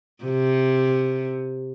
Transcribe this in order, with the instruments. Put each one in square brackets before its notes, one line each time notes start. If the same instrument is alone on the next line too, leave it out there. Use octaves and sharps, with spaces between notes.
[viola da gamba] C3